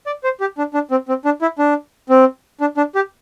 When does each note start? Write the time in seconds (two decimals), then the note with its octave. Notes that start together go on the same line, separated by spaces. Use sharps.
0.06 D5
0.24 C5
0.40 G4
0.58 D4
0.74 D4
0.91 C4
1.08 C4
1.25 D4
1.42 E4
1.59 D4
2.09 C4
2.61 D4
2.77 D4
2.95 G4